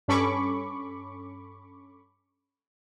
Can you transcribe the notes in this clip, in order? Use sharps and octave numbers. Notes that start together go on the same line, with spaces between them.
G2 C#4 A4 B5 C#6 D6